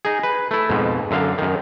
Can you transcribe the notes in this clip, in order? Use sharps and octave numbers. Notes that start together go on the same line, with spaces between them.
D#4 G#4
B4
A3 E4
F2 G#2 B2
F#2 D3 F5
F#2 D#3